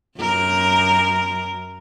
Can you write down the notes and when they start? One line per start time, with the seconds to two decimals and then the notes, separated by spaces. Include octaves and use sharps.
0.19 F#2 A#4